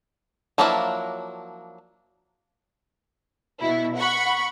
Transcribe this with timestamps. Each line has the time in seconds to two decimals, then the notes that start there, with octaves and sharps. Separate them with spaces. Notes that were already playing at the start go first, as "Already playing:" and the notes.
0.58 F3 F#3 A#3 D4 E4
3.60 B2 E4
3.96 F#5 B5 C#6